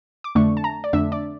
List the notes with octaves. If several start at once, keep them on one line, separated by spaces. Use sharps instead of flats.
D6
F2 D3 A3 D4 C#6
A5
A#5
D5
F2 D3 A3 D4 E5
D5